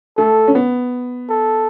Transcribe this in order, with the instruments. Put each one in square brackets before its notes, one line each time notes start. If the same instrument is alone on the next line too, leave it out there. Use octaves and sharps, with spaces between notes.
[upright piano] A3 [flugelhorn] A4
[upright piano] C#4
B3
[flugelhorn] A4